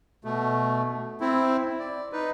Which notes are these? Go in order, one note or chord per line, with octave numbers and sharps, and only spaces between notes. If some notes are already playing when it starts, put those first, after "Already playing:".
B2 A3
C4 E4
D5
D#4 B4